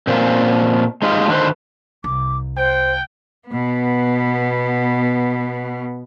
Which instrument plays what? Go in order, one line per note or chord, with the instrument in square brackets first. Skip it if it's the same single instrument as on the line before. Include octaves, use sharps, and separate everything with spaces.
[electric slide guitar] A#2 C4 C#4 F4
G#3 D#4 F4 G4
D3 D#3 F4 B4 C5
[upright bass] C2 [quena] D6
[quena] C5 [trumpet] G5
[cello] B2 B3